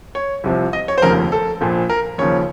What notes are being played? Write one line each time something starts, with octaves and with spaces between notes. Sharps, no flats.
C#5
C2 C3 F3
D#5
C#5
C5
F1 D#2 C#3 F3 A#4
A4
A#1 A#2 F3
A#4
D#2 C#3 F3 C#5